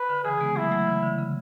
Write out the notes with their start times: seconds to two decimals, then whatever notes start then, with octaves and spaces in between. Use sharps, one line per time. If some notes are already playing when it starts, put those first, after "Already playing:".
Already playing: B4
0.09 D3
0.24 C#3 E3 G#4
0.41 G#3 B3
0.56 F#3 A3 E4
0.72 F#3 A3
0.87 C#3 E3
1.03 D3
1.19 C#3